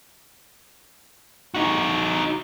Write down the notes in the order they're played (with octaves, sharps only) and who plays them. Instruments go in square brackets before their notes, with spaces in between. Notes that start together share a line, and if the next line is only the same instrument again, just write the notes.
[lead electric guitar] D#4 F#4